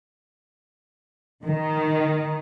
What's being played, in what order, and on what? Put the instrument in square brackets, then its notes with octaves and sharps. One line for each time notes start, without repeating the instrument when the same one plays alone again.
[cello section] D#3